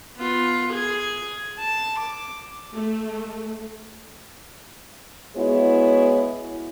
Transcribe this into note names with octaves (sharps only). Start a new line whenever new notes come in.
B3 F4
G#4 G#5
A5
D6
A3
G#3 B3 E4 F#4 G#4 C#5